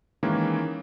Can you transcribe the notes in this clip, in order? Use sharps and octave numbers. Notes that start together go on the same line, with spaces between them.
D#3 E3 G#3 A#3 C#4